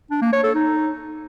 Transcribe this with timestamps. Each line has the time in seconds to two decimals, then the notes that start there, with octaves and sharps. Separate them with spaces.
0.11 D4
0.22 A#3
0.33 C#5
0.44 A4
0.55 D#4